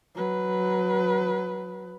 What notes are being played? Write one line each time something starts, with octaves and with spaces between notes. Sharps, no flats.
F#3 B4